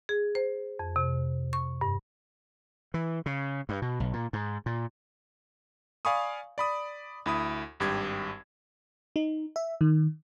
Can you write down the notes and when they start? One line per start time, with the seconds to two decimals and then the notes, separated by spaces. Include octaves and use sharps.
0.09 G#4
0.35 C5
0.79 F2
0.96 C3
1.53 C#6
1.81 G2
2.94 E3
3.26 C#3
3.69 G2
3.82 B2
4.00 B1
4.13 A#2
4.33 G#2
4.66 A#2
6.05 D5 F5 G#5 B5 C#6 D#6
6.58 D5 B5 D#6
7.26 D2 E4 B5 D#6
7.80 G#1 G2 G4 G#6
9.16 D#4
9.56 E5
9.81 D#3